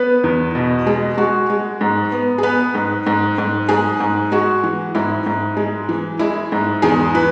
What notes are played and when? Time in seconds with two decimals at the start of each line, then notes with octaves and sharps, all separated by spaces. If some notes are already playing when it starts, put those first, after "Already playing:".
Already playing: B3 B4
0.24 E2
0.55 B2
0.86 G#3
1.17 G#3 F#4
1.50 G#3
1.81 G#2
2.12 B3
2.38 G#4
2.43 B3 B4
2.74 G#2
3.06 G#2
3.38 G#2
3.69 G#2 G#4
4.00 G#2
4.32 G#3 F#4
4.63 E3
4.95 G#2 E4
5.26 G#2
5.57 G#3
5.89 E3
6.19 G#3 E4
6.52 G#2
6.82 E2 G#4
7.14 E3 B4